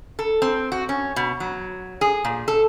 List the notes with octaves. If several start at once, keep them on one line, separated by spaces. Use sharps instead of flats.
A4
C4
F#4
C#4
B2
F#3
G#4
A#2
A4